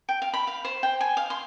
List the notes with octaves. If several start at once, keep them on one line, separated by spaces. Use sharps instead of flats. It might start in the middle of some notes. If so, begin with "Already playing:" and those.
G5
F5
B5
F5
C5
G5
G#5
F5
C6